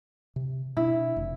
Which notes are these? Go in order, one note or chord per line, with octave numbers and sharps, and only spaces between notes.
C3
B2 C#4 D4 E4
F1